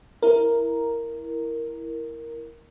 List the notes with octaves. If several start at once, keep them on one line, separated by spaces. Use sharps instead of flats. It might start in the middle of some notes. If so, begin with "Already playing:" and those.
E4 A#4